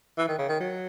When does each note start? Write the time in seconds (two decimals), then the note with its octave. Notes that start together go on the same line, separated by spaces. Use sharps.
0.18 E3
0.28 D#3
0.38 C#3
0.49 D#3
0.60 F#3